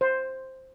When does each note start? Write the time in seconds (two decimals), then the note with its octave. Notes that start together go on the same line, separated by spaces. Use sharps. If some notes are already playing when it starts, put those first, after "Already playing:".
0.01 C5